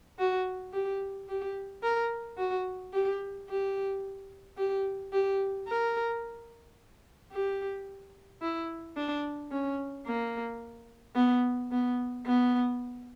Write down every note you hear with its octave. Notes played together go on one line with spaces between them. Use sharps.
F#4
G4
G4
A#4
F#4
G4
G4
G4
G4
A#4
G4
E4
D4
C#4
A#3
B3
B3
B3